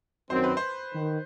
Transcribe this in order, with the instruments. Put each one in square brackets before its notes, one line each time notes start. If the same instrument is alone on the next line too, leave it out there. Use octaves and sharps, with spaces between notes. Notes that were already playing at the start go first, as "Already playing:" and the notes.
[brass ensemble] F#2 D#3 F#3 C4 [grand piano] C5
[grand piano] B4
C5
[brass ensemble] D#3